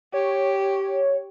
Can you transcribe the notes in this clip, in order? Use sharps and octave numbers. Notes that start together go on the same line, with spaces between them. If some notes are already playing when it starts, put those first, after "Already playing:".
G4 C#5